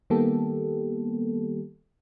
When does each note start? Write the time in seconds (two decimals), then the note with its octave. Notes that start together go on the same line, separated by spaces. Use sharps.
0.10 D#3 G3 A#3 B3 G4 A4